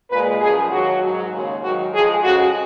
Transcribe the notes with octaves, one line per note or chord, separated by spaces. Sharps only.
A#2 G#3 B4
F#2 F3 G#3 G#4
D#2 D#3 F#3 F#4
G#2 F#3
D#2 C#3 G#3
G#2 D#3 F#3 F#4
F2 F3 G#3 G#4
F2 C#3 G#3 F#4